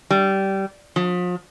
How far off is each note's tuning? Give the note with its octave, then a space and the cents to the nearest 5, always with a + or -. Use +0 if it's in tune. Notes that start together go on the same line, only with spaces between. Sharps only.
G3 -15
F3 +40